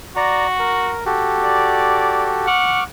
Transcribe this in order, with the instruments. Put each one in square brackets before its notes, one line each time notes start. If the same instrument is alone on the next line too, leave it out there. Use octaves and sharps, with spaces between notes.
[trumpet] F#4 [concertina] D5 A#5
[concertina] A#4
F#4 G4 A4
[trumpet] D5
[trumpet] F#5 [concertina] C#6 D6 F6